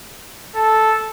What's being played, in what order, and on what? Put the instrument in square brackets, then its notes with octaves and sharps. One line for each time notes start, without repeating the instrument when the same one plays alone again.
[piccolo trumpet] A4